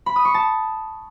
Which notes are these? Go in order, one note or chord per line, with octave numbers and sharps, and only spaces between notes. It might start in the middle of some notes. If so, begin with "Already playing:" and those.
B5
D#6
C#6
A5